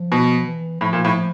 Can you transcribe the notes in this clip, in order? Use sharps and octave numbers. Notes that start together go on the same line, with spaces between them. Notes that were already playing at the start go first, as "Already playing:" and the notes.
Already playing: F3
B2
E3
A2 F3
A#2
A2